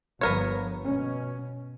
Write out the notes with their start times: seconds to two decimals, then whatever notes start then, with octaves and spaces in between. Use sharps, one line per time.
0.21 G1 F3 B3 A#4 C#5
0.83 B2 C#4